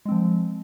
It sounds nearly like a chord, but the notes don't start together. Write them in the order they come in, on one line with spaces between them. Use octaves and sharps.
G#3 C4 F3